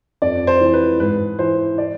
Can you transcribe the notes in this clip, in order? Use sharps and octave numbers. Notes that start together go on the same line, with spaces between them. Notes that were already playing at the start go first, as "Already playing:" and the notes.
F2 D5
C5
E3
B4
G#2 B4
E3 C5
D5